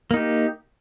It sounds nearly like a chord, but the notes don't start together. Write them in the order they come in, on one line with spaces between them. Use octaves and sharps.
A#3 D#4 G4